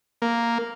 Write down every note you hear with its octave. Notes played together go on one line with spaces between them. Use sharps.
A#3